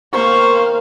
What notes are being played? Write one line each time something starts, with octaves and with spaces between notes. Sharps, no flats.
B2 D#3 A#3 C4 C5 F5 C#6